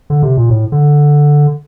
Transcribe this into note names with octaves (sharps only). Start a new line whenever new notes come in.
D3
C3
A#2
A2
D3